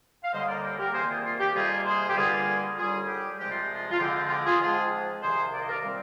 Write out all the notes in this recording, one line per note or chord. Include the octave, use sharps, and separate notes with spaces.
F5
D#2 D3 G3 A#3 C5 D#5
A#4 D5
G4 A#4
G4 A#4
C2 C3 D#3 A#3 G#4 C5
F4 G#4
F4
G4
F2 C3 G3 A#3 F4 G#4
G#4 C5
G4
G2 D3 G3 A#3 F4 G#4
D#2 D3 G3 F4 G#4
G4
C2 C3 F3 G#3 G4
F4
F4
F4
F2 D3 F3 G#3 C4 G4
F4
F4
G4
F4 G#4
G#2 F3 G#3 C4 F4 G#4
C2 C3 D#3 A#3 G#4 C5
D5
D#5
A#4 D5
A#2 G3 C4